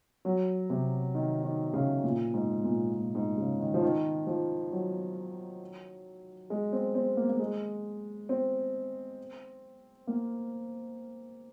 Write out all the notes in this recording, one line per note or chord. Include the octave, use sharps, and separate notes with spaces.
F#3
C3
D#3
D#3
C#3
A#2
G#2
A#2
A#2
G#2
C#3
D#3
F3
D#3
F3
F#3
G#3
C4
C4
A#3
A#3
G#3
C4
A#3